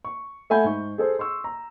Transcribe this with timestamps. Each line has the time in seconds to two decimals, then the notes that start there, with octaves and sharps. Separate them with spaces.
0.05 C#6
0.50 A3 E5 F#5 G#5 B5 G6
0.64 G#2 C#6
0.98 G#4 A4 C5
1.19 C6 C#6 E6
1.44 A#5